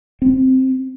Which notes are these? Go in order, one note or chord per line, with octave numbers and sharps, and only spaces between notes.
C4